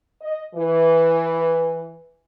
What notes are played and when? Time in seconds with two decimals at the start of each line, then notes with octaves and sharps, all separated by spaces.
0.22 D#5
0.55 E3